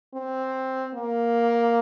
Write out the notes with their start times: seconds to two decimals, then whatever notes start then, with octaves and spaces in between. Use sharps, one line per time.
0.14 C4
0.94 A#3